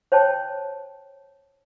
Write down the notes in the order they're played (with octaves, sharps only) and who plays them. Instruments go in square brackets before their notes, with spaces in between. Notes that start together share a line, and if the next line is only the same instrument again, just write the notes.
[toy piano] C5 C#5 G5 A5